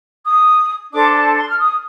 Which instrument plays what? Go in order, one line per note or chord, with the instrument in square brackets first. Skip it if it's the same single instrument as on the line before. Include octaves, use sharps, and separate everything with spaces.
[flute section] D#6
D4 A4 C5 D6
A5
C6
F6
D#6